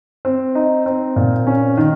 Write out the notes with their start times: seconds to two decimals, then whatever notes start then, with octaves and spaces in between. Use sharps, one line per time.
0.25 C4
0.55 D#4
0.86 C4
1.16 A#2
1.47 C#4
1.77 D#3